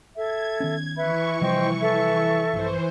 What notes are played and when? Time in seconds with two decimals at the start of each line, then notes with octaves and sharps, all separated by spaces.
0.16 A4 E5 G#6
0.60 D#3 B3 C#4
0.97 E3 B4 E5 B5 C#6
1.41 C3 F3 G3 C5 D#5 G5
1.81 A4 E5
2.53 A#1 G2 E3 C5